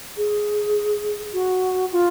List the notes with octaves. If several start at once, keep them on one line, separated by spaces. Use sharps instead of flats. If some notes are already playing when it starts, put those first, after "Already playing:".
G#4
F#4
F4